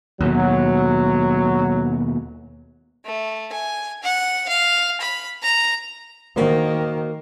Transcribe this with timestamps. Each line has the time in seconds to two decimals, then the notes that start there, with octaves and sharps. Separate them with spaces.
0.21 D#2 B2 F#3
3.05 A3
3.52 G#5
4.03 F#5
4.48 F5
5.01 B5
5.43 A#5
6.36 D#3 A#3 F#4 C5